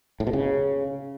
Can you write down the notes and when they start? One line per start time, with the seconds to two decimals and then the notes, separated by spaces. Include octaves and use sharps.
0.20 A2
0.27 B2
0.33 C#3